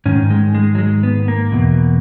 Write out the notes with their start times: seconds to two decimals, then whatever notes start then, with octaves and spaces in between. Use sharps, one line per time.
0.06 G#2 D#3 C#4
0.30 G#3
0.55 G#3
0.75 F#3
0.78 G#3
1.03 B3
1.28 A#3
1.52 E2 B2